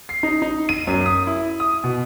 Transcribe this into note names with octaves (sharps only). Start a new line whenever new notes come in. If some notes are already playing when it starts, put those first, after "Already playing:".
C7
D#4
D#4
D#7
F#2
D#6
E4
D#6
B2